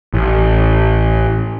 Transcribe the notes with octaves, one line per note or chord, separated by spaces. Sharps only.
A1